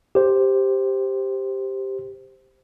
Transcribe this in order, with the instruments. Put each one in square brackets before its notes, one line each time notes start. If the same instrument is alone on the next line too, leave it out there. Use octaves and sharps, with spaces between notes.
[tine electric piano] G4 C5